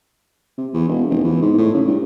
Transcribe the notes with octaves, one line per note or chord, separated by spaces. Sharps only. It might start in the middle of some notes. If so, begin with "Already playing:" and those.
C3
E2
E1
F1
E2
G#2
A2
C#3
G2